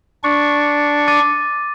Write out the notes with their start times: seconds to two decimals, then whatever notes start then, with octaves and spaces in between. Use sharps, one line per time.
0.24 D4 C#6
1.08 D6 A6 D#7